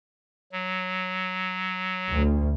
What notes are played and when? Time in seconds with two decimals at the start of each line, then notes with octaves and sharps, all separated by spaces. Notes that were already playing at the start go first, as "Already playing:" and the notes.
0.52 F#3
2.11 D2